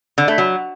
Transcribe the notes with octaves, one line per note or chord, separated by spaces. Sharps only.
D3
A3
F#3